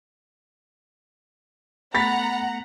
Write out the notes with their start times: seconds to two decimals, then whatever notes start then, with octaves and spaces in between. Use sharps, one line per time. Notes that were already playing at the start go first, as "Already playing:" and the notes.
1.94 A3 B3 F#5 A#5 B5 A6 B6